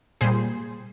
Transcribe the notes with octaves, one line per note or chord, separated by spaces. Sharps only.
A#2 G3 G#4 C5